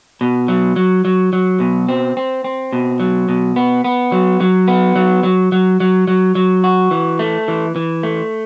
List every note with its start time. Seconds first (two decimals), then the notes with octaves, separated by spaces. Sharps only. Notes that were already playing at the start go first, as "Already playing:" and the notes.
0.21 B2
0.48 F#3
0.76 F#3
1.05 F#3
1.33 F#3
1.60 B2
1.89 C4
2.17 C4
2.44 C4
2.73 B2
3.00 F#3
3.29 B2
3.56 B3
3.84 B3
4.12 F#3
4.40 F#3
4.68 B3
4.96 F#3
5.23 F#3
5.52 F#3
5.80 F#3
6.08 F#3
6.35 F#3
6.64 F#4
6.91 E3
7.19 A3
7.48 E3
7.76 E3
8.03 A3